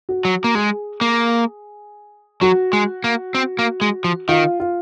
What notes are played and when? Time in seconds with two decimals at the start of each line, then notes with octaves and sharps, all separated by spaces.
0.09 F#4
0.25 F#3
0.44 A#3
0.55 G#3 G#4
1.01 A#3
2.41 F#3 F#4
2.73 G#3
3.04 A#3
3.35 C4
3.59 A#3
3.81 G#3
4.04 F3
4.29 D#3 F4
4.60 F4